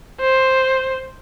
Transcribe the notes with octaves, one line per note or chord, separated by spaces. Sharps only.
C5